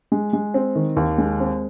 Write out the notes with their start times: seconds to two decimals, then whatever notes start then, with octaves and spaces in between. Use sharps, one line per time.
0.12 G#3
0.33 G#3
0.54 C4
0.75 D#3
0.97 D#2
1.18 G#3
1.40 C4